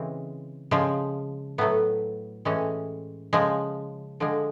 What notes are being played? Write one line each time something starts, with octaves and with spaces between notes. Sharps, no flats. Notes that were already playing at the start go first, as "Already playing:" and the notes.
Already playing: C#3 E3 G#3 C4
C#3 F3 G#3
A2 F#3 A3 B3
A2 E3 G#3 C#4
C#3 F3 G#3
D3 F3 G#3